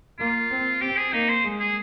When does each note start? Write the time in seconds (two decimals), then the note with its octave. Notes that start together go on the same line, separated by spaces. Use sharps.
0.19 A#3 F4
0.50 C4
0.81 C4 G4
0.97 G#4
1.13 A#3 D#4
1.29 C5
1.44 G#3
1.60 G#4